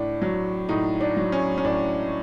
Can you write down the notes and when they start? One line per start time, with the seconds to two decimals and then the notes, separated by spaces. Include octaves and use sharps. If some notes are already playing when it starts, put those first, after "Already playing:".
Already playing: A2 D4
0.22 F#3
0.69 A2 D#4
1.01 D4
1.17 F#3
1.32 C#4
1.58 C#4
1.64 A2 D4